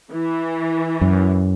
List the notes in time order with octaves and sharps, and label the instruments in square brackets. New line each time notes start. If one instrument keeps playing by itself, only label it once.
[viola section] E3
[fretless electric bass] F#2